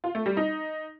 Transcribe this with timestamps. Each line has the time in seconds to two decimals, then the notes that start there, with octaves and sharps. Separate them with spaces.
0.04 F4
0.15 A3
0.26 G3
0.37 D#4